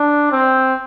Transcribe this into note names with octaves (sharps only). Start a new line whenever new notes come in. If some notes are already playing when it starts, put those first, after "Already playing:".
Already playing: D4
C4